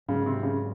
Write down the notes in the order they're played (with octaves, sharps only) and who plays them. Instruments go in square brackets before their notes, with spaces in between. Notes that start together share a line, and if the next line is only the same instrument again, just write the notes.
[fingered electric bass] G#2 F#3 C4 [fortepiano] C#3
[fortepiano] C3
C#3